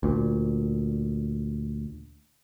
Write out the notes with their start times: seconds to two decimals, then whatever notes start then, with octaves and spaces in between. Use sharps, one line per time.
0.03 D2 A#2